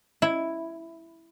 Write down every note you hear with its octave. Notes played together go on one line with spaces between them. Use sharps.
E4